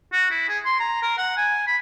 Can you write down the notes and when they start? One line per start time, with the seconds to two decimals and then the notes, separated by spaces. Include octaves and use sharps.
0.12 F#4
0.30 E4
0.48 G#4
0.65 C6
0.79 A#5
1.02 A#4
1.18 F#5
1.37 G#5
1.67 B5